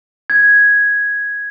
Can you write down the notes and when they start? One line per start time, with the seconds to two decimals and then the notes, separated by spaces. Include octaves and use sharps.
0.30 G#6